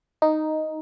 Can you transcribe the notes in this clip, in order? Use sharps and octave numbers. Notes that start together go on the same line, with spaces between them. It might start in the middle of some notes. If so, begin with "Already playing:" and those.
D#4